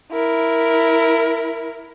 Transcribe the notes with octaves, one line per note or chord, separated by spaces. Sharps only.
E4 A#4